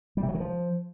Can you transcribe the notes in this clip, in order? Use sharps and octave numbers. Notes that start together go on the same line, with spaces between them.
G3
C3
F#3
D#3
F3